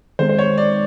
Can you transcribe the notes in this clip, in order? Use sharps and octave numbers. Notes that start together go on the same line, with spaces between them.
D#3 G#3 C4 C5
C5
C#5
D5